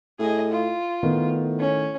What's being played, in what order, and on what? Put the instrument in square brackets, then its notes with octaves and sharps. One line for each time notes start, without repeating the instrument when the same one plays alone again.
[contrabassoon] A2 [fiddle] G#4 D#5
[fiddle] F4
[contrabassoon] A2 [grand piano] D#3 [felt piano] B3
[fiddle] C#4